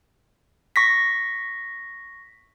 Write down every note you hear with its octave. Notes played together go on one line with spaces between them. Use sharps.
C#6 A#6 B6